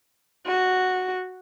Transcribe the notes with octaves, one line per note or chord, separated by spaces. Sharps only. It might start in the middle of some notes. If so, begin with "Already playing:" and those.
F#4